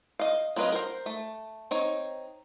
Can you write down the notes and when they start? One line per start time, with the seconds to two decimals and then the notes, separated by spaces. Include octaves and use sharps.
0.19 D#5 F5
0.56 F#3 C4 F4 B4 D#5
0.72 A#4 C5
1.06 A3
1.71 C4 D#4 C#5